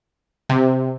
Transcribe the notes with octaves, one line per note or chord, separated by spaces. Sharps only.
C3